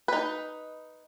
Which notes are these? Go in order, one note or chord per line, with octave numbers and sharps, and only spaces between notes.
D#4 B4